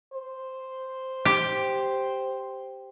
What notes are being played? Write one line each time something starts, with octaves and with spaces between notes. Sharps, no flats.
C5
G4